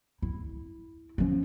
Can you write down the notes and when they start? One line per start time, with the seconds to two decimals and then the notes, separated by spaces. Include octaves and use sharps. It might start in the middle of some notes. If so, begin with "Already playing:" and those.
0.22 E4
1.18 F3 C#4